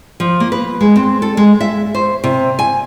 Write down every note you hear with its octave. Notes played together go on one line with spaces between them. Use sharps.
F3
A#3
B4
G#3
C4
A4
G#3
E5
C5
C3
G#5